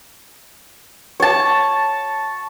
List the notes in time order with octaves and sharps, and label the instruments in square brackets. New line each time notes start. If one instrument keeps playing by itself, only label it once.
[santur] C#5 A5